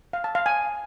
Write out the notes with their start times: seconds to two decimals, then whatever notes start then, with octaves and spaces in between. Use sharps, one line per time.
0.13 F5
0.24 A5
0.35 F5
0.46 G#5